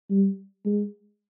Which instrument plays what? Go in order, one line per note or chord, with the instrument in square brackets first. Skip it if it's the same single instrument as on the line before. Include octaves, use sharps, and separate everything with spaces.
[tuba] G3
G#3